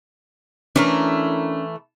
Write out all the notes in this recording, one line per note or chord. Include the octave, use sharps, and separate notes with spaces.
E3 A3 C#4 D4 A#4